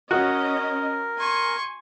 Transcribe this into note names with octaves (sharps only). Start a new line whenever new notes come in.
C#4 F#4 A#4 D#5
G#5 C6 C#6